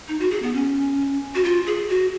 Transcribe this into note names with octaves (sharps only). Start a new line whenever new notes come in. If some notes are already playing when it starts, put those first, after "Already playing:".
D#4
F#4
G#4
B3
C#4
F#4
F4
G#4
F#4